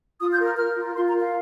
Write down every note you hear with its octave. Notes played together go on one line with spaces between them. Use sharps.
F4 D#6
G6
A#4
F6
A#4 F6
F4
F4 C6
A#5
A#4
F5